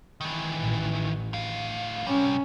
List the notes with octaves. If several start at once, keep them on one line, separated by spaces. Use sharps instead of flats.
D#3 E3
A1
A2 F5
C3 G3 C#4